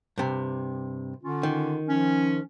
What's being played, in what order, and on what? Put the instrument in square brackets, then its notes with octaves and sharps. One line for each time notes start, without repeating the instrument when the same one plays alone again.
[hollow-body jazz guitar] G2 C3
[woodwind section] D3 C#4 F4
[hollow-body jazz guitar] D#3
[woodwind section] F3 C#4